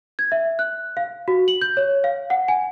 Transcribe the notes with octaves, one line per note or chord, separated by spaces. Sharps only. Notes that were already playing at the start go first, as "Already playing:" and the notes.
G#6
E5
F#6
F5
F#4
F#7
G6
C#5
F5
F#5
G#5